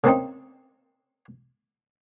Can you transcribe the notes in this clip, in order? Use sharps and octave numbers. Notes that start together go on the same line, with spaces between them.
C#3 A#3 C4 D#4